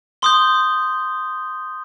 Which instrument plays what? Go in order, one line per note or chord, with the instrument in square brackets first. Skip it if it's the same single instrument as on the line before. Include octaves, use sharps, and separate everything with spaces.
[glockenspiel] C6 D#6 G6 G7